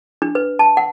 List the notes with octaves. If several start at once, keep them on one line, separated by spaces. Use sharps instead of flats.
D4
B4
A5
F#5